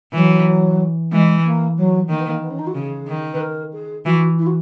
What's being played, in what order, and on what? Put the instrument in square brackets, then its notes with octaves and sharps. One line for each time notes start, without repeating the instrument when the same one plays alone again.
[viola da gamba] E3 [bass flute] F#3
[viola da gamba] E3 [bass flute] G#3
[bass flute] A#3
F#3
[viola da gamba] D#3 [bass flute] A#3
[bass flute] B3
A#3
B3
C#4
D#4
F#4
[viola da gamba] C#3 [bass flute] G#4
[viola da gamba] D#3
[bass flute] B4
A#4
G#4
[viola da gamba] E3 [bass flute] F#4
[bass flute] E4
F#4